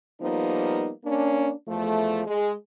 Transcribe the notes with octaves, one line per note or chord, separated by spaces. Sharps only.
F3 G3 A#3 B3 D#4
A#3 C#4 D4
E2 F3 A3
G#3